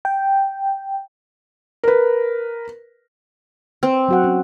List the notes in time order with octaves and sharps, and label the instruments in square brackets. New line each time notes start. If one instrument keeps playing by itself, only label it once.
[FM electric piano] G5
[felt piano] A#4 B4
[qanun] C4
[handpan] F#3 F#4 F#5
C#4